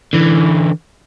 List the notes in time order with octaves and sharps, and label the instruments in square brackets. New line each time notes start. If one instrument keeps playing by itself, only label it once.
[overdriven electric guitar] D3 E3